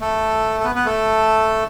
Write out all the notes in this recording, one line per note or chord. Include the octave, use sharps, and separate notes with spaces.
A3 A4
A4
B3 B4
B3 B4
A3 A4